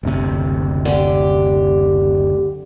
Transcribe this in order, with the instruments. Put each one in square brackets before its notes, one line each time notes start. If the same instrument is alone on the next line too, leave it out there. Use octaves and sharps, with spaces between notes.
[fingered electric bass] F#1 D2 C3
[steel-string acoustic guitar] D3 G4